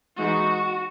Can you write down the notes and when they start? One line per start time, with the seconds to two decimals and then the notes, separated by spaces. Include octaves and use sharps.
0.17 E3 G#3 D#4 F#4